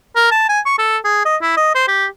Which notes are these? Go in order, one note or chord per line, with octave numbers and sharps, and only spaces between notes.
A#4
A5
G#5
C#6
A4
G#4
D#5
E4
D#5
C5
G4